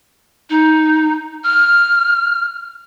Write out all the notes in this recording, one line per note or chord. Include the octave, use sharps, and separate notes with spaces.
D#4
F6